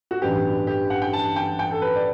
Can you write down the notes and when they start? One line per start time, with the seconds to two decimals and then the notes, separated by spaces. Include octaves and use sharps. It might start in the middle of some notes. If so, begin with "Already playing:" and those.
0.11 F#4
0.22 A1 G2 F#3 B3 G4
0.67 G4
0.90 F#5
1.02 G5
1.13 A5
1.36 G5
1.59 G5
1.71 A4
1.82 B4
1.96 D5